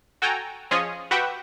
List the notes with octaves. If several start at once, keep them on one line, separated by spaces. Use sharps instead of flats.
F#4 A4 G5 G#5 A#5
F3 C#4 F4 G#4 C#5 D#5
F#4 G4 B4 E5 F#5 G5